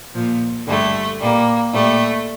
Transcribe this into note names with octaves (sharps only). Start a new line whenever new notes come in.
A#2 F3
G2 D3 G3 A3
A#2 G3 A#3
A#2 G3 A3